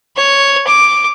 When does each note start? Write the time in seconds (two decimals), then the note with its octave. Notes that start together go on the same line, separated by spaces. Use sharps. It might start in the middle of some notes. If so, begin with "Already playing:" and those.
0.16 C#5
0.67 D6